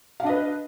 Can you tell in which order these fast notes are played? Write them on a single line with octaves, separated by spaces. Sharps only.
F5 D4 D#5 B4